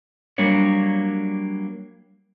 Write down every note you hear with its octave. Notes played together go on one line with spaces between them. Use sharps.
F#3 G3 A#3 D4 C#5